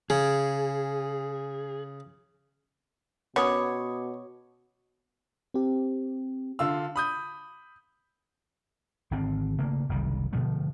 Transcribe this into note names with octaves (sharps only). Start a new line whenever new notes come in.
C#3 G#4
B2 B3 C#4 C#5 B5 D6 D#6
C4 G4
D3 F4 E6
B5 D#6 G6
G#1 D3 C4
C#3 A3 A#3
F#1 C2 D#3 G3
B2 D3 F3 A3